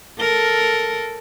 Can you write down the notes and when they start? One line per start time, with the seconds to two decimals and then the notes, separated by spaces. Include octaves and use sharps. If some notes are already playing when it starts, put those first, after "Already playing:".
0.20 A4 A#4